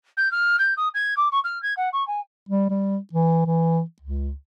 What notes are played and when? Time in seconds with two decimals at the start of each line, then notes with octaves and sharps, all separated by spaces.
0.17 G6
0.31 F6
0.58 G6
0.77 D#6
0.94 G#6
1.16 D6
1.32 C#6
1.44 F6
1.62 G#6
1.77 F#5
1.93 C#6
2.07 G#5
2.49 G3
2.70 G3
3.13 E3
3.46 E3
4.02 C#2